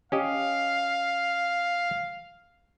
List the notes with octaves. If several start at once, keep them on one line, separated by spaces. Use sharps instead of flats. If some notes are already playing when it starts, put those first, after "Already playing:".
C#4 G4 D#5 F5